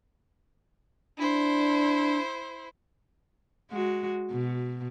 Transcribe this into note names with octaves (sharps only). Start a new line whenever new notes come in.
D4 E4 C5
G#3 F#4
B2